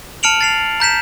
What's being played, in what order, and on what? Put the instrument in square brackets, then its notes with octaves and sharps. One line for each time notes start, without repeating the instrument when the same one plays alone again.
[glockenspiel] A5 F6 C#7 D7 F7 F#7
A6 C7 F7
A#5 G6 B6 E7